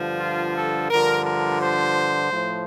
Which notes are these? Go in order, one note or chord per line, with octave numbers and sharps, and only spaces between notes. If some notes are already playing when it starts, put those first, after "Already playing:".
Already playing: G2 D3 F3
F4
A4
G2 D3 F3 A#4
A#4
C5
A2 F3